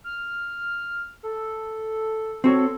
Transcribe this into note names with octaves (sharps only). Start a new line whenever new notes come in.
F6
A4
C4 F#4 A4 C#5